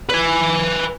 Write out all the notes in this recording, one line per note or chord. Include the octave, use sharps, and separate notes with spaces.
B4 G#5